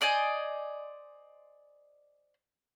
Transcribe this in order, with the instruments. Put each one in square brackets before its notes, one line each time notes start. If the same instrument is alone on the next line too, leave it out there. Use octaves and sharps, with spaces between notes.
[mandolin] C5 D5 D#5 G#5